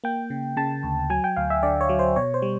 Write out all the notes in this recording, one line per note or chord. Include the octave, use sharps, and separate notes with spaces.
A#3 G5
C#3
C#3 A5
D2
F#3 G#5
G5
D2 F5
E5
D3 D5
C#5
F#3
C5
B2 C#5
C5
G3